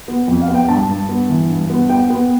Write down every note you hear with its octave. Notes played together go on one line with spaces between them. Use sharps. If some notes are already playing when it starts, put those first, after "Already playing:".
B3
F2
F5
B3
G5
G2 A5
G2
B3
E3
G2
B3
B3 G5
B3